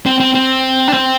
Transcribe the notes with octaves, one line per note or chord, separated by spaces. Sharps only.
C4
C4
C4
D4
C4